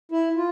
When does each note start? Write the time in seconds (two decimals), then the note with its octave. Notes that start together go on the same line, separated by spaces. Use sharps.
0.12 E4
0.36 F4